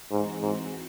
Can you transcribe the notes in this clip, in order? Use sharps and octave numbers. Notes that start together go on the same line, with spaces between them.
G#2 E3 C4 F#4
G#2